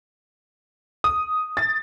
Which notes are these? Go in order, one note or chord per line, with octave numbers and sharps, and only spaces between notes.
D#6
A6